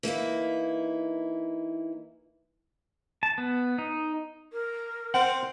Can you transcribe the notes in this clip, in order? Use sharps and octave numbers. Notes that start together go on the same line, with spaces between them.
E3 A#3 D#4 E4
A5
B3
D#4
A#4
C4 F#5